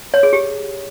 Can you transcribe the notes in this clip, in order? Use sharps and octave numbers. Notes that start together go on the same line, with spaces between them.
C#5
G#4
G4